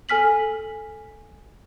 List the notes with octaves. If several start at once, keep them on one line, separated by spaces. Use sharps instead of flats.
A4 G#5 F6 B6 F#7